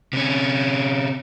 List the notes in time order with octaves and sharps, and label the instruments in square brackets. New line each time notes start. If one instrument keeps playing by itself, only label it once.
[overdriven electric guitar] C3 C#4